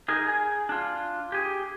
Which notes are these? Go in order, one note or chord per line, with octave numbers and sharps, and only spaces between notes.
D#4 G#4 A#4
G#4
D4 F4
G4 G#4